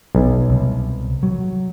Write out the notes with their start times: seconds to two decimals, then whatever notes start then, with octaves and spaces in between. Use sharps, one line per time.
0.15 B1
0.49 C2
1.23 F#3